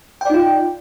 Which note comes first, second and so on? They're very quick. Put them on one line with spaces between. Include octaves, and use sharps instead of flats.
G5 D5 D#4 F4